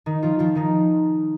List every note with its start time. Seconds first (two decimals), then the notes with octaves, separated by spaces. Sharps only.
0.06 D#3 D#4
0.23 F3 F4
0.39 F3 F4
0.55 D#3 D#4